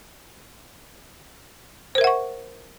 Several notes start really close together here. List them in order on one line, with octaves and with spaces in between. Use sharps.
C5 A#4 E5 F#5 C#6